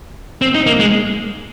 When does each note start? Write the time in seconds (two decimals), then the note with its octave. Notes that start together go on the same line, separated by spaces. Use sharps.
0.42 C4
0.55 D#4
0.66 A#3
0.80 G#3